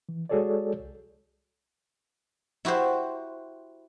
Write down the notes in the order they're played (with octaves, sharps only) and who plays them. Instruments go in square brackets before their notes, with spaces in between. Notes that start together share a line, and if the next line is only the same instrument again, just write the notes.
[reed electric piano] E3
G#3 F#4 G#4 A4 C#5 D5
C2
[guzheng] E4 F#4 G4 C5